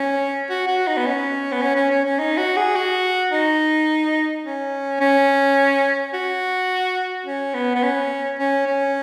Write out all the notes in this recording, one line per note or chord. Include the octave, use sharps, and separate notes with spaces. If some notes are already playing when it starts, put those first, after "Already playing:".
Already playing: C#4
F#4
F#4
D#4
B3
C#4
B3
C#4
C#4
C#4
C#4
D#4
F#4
G#4
F#4
D#4
C#4
C#4
F#4
C#4
B3
B3
C#4
C#4
C#4